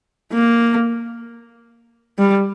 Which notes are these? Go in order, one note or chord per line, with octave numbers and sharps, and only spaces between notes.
A#3
G3